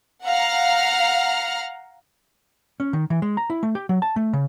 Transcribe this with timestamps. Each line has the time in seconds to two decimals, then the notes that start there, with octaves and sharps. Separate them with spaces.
0.24 F5 F#5 A#5 F6
2.80 C#4
2.93 D#3
3.10 E3
3.22 G#3
3.37 A#5
3.50 E4
3.63 A3
3.75 G4
3.89 F#3
4.02 A5
4.16 A3
4.33 C#3